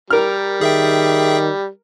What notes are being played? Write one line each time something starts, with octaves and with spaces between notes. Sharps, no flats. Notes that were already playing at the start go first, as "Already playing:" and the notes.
G3 A#4 F6
D#3 G#4 E5 G5